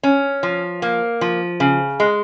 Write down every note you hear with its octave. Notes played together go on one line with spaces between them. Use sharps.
C#4
F3
A#3
F3
C#3
G#3